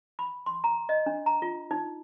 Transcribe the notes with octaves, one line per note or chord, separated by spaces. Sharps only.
B5
C6
A#5
D#5
D4
A#5
F4
D#4